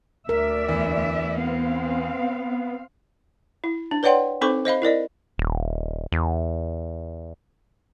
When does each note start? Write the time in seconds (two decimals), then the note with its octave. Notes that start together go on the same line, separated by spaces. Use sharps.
0.29 D2 A#4 D5 E5
0.69 E2
1.38 B3 C4 F5
3.64 E4
3.91 D4
4.03 B4 C#5 D5 F#5 G5 C6
4.41 C4 D#4 A4 C5 C#6 D6
4.65 C5 D#5 F5 B5
4.82 E4 A#4 D5 D#5
5.38 D#1
6.12 E2